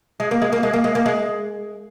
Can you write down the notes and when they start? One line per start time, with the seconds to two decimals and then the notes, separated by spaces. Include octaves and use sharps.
0.20 G#3
0.31 A#3
0.42 G#3
0.52 A#3
0.63 G#3
0.73 A#3
0.84 G#3
0.95 A#3
1.06 G#3